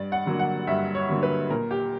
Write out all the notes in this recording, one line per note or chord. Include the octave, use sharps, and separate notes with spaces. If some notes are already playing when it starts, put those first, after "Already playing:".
Already playing: G2 D5
F#5
D3 F#3 A#3
F#5
G2 E5
C#5
D3 F#3 A#3
B4
A#2 A#4
G4